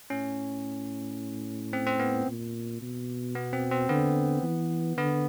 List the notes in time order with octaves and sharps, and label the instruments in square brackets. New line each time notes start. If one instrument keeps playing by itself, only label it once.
[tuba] A2 [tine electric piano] C#4
[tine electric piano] C4
C4
B3
[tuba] A#2
B2
[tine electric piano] B3
C4
C4
[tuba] D3 [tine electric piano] B3
[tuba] E3
[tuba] D3 [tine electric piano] B3